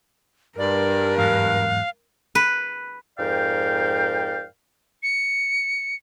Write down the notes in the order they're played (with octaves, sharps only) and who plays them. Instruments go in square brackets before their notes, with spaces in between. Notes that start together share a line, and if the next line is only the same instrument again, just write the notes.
[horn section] G2 [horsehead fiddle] A#4 [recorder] D5
[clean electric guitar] E2 G#2 F#3 [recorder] F5
[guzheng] B4
[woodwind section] F2 G#2 A#4 D5 F5 G5
[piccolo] C#7